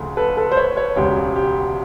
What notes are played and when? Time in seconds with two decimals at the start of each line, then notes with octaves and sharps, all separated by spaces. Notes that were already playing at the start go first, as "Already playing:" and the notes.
Already playing: D2 C#3 F3 A3
0.17 A4 B4
0.37 A4 B4
0.51 C5
0.57 B4 C#5
0.76 B4 C#5
0.96 E1 D2 C#3 G4
1.36 G4